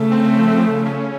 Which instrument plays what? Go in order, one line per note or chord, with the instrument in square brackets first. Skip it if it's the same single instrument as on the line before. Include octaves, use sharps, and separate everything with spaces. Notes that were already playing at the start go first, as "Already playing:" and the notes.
Already playing: [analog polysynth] C#3 [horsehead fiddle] A3
[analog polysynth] C4
F3
C#3
C#4